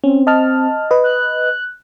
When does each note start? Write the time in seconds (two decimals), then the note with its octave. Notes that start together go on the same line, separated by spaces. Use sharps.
0.04 C4 C#4
0.27 D#5 A5 F6
0.91 B4 D#5
1.04 F#6